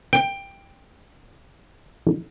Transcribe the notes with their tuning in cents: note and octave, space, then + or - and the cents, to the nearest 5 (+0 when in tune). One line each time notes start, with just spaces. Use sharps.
G5 +10